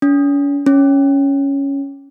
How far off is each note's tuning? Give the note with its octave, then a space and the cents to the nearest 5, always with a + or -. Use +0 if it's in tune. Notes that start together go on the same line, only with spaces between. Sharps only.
C#4 +40
C#4 +5